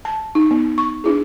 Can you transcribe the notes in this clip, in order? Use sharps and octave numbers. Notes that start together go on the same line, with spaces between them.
A5
D#4
B3
C#6
D4 E4 G#4